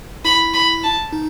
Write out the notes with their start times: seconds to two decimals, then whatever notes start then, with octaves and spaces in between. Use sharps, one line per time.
0.25 E4 B5
0.54 B5
0.83 A5
1.13 D#4